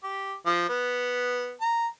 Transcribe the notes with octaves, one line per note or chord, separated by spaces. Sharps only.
G4
F3
B3
A#5